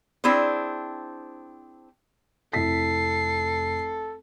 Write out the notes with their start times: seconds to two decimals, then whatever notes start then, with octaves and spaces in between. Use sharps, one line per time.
0.24 C4 D4 E4 G#4 C5
2.53 F1 E4 A4 B6 C7